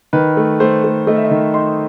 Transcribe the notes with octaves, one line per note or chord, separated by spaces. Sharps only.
D#3 B4
A3
A3 C5
A3
A3 D#5
E5
D#5
D#3
D#4 C6